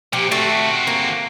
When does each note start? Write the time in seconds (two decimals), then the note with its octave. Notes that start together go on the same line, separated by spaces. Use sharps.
0.13 A#2 F3 G4
0.32 A3 C4 F#4
0.87 A#3